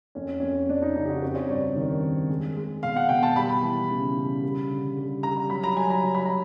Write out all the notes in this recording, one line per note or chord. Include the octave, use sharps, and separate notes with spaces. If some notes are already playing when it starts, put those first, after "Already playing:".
F2 C#4
F2 C#4
F2 D4
D#4
C#3 D#4
G4
F#4
C4 G4
C#5
G2 D5
D#3
C4
G#3
G#3
B2 F5
F#5
B2 G5
A5
G3 B5
E3
C#3
C#3
G3
D3
G3
G3 A#5
F#3 B5
A#5
F#3 G#5
A#5
F#3
B5
A#5